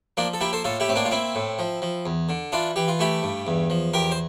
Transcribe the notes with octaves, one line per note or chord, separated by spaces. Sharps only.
F3 A#3 D4
A4
A#3 E4 G4
A4 C5
A2 F4 A4
E4 G4
A2 C4
A#3 D4
F4
A#3 C4 E4
A2
F3
F3
E2
D3
E3 D4 F4
E3 G4
F4
A3 E4 G4
G2
E2
F3
E2 G4 A#4
C5